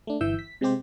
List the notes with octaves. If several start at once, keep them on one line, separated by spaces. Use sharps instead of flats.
A3 D4
G1 E3 E5 E6 G6
B6
C3 G#3 C4 G4 C5